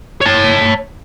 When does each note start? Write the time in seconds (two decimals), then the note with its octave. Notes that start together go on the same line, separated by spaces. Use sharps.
0.21 C#5 A5